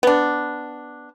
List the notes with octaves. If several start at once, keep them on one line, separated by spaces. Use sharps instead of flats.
B3 D4